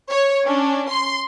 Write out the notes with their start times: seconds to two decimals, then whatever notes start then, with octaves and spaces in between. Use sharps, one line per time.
0.10 C#5
0.45 C#4 D4
0.90 C6